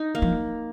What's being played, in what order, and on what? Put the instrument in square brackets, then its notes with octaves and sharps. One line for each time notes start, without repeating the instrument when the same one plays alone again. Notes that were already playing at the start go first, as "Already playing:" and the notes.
Already playing: [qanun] D#4
A#3
[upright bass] F3